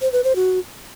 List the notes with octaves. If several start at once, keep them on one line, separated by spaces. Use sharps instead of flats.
C5
B4
C5
F#4